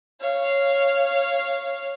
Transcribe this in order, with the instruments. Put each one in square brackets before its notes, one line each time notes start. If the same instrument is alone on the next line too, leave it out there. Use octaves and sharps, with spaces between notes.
[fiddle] C#5 F5